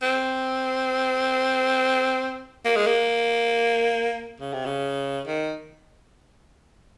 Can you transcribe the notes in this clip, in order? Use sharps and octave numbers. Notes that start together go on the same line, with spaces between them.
C4
A#3
G#3
A#3
C#3
C3
C#3
D#3